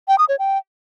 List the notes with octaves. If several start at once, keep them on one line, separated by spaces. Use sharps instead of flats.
G5
D#6
C#5
G5